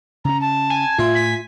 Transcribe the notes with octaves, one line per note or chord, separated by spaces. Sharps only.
C#3 C#4 A#5
A5
G#5
A2 F4 E5 C6
B6